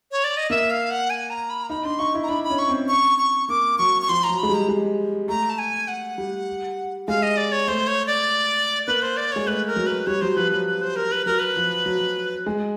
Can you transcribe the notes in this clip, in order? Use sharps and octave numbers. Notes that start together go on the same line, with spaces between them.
C#5
D5
D#5
A#3 E5
F5
F#5
G#5
A#5
B5
A#5
D#4 B5
D4 C6
D#4 C#6
E4
A#5
D4 B5
B5
C#4
C#6
C4
C#6
C#6
A#3 D6
F#3 C#6
C#6
F3 C6
A#5
F#3
G#3 B5
G3
A#5
G#3
A3 A#5
A5
G#5
F#5
G3
G#3 F5
D#5
D5
C#5
A3 C5
C#5
D5
A#3 B4
C5
D5
G#3 C#5
A3 B4
A#4
F#3
B4
G3 C#5
F#3 C5
F3 B4
F#3 B4
B4
C5
A#4
B4
F#3 A#4
B4
F3
F#3
G#3